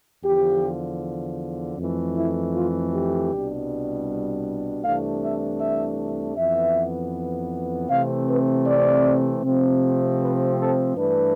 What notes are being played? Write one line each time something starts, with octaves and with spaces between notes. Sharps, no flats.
E2 D3 F3 G4
F2 E3 A3
E4
F4
G4
C2 B2 G3 D4
C2 C3 E3 A3 D4 F5
E5
E5
F2 E3 B3 E5
C3 E3 A3 C4 F5
B4
D5
C3 F3 A3 C4
B4
A4
G2 E3 A3 D4 B4